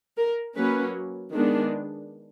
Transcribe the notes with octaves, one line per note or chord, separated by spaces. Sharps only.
A#4
F#3 A#3 C#4 B4
D#3 G#3 B3 D4